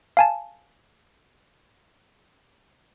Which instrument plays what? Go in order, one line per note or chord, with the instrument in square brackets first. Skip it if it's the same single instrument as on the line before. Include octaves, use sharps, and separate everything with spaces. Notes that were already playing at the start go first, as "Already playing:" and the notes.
[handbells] F5 G#5 A5